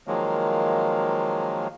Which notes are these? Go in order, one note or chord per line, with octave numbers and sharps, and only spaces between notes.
D#3 F3 F#3 G#3 A#3